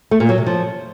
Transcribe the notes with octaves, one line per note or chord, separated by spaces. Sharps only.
A3
A#2
F#3
C3
F3